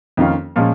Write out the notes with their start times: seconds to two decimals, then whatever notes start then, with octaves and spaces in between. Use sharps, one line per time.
0.17 F2 D#3 A#3 C#4 F4
0.56 A#2 F3 G#3 C#4